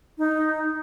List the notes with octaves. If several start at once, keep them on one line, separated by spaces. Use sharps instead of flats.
D#4